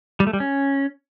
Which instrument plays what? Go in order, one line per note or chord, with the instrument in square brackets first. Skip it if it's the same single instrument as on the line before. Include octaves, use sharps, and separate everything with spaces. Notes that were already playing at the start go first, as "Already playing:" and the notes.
[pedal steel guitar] G3
A3
G3
C#4